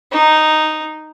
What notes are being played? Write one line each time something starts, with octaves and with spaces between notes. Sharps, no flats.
D#4